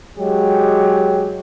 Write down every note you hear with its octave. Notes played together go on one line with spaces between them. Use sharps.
F#3 G#3 G4